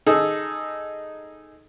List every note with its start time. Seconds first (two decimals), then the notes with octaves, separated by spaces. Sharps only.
0.06 D#4 G#4 A4